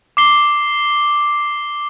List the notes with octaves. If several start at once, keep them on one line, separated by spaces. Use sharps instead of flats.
D6 C7 G7